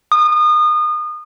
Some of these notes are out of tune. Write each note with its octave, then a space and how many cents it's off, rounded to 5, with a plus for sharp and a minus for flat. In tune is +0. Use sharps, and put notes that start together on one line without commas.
D#6 -30